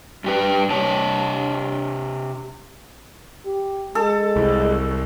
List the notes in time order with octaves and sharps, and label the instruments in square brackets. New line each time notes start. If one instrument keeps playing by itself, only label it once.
[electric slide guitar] G2 G4 B4
C3 C#5 A5
[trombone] G4
[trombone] G#3 [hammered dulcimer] A4
[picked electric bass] C2